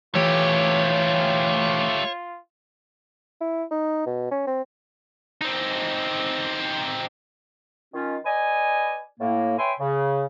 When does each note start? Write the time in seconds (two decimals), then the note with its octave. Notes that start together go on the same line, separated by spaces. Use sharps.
0.15 E3 A3 F4 G4 C#5
3.41 E4
3.71 D#4
4.06 B2
4.31 C#4
4.47 C4
5.42 C4 D#4
7.93 D#3 C#4 F4
8.25 B4 D5 D#5 G#5
9.20 A2 A#3
9.58 B4 C#5 E5 G5 G#5 C6
9.79 C#3